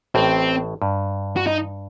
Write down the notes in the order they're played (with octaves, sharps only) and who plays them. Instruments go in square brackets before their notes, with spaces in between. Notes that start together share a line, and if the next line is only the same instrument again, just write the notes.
[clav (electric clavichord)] A1 A2 [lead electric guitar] C4
[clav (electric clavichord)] G2
[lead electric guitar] F#4
D#4